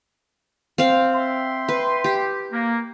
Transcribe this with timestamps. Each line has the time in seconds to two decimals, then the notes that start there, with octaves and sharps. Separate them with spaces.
0.78 C4 F5
1.15 E5 G5 C6
1.69 B4
2.04 G4
2.52 A#3